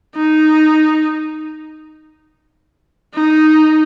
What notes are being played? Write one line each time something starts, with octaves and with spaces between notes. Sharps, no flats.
D#4
D#4